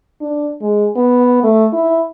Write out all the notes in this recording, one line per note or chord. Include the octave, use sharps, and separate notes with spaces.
D4
G#3
B3
A3
E4